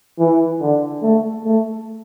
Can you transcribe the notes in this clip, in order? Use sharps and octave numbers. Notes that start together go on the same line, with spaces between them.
E3
D3
A3
A3